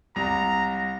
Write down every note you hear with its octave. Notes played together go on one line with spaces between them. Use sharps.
C2 A#5